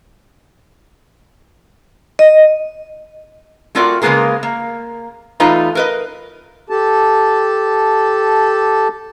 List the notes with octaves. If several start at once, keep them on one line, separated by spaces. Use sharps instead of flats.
D#5
A3 C4 F4 F#4 A#4 D5
C#3 G#3 A#3 B3 G#4 A#4
A#3
E2 A3 D#4 F4 B4 A#5
A#4 B4 D#5
G4 A4 A5